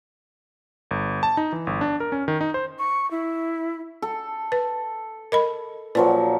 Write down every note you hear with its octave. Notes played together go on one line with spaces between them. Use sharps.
G1
A5
D#4
E3
G1
D4
A#4
C#4
D#3
D#4
C5
C#6
E4
A4
B4
A#4 D#5 B5
A#2 F3 F#3 B4